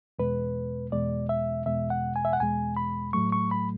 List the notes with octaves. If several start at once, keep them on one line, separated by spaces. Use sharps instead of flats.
E2 B2 G#3 B4
E2 B2 G#3 D5
E5
E2 B2 G#3 E5
F#5
G#5
E5
F#5
E2 B2 G#3 G#5
B5
A2 F#3 A3 C#6
C#6
B5